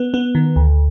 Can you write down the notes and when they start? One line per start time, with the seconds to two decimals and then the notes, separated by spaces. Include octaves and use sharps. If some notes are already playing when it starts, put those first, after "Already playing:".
Already playing: B3
0.14 B3
0.35 D#3
0.56 D2